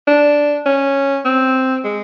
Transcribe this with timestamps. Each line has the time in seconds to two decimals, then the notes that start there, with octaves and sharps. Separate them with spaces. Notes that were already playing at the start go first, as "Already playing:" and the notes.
0.07 D4
0.66 C#4
1.25 C4
1.85 G#3